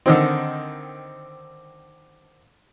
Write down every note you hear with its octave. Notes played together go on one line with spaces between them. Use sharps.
D3 D#3 C4